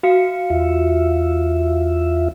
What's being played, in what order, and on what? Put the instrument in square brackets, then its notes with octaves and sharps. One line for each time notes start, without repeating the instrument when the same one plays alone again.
[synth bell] F#4 F5 C#7
[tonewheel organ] E2 F4 E5